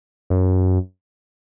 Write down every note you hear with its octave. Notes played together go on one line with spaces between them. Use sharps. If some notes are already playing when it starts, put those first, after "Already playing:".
F#2